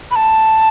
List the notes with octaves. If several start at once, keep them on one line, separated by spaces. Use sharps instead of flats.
B5
A5